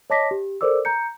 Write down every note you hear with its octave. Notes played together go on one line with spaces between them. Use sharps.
C#5 D#5 A5 D6 A#6 B6
G4
A4 A#4 C5 D5 D6 E6
A#5 G6 C#7